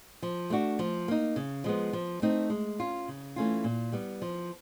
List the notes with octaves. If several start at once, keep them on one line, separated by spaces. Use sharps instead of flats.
F3
A3 D4 F#4
F3
A#3 D#4
C#3
F3 G#3 B3
F3
A3 C4 D#4
G#3
C#4 F4
C#3
E3 A3 C#4 F4
A#2
G3 B3
F3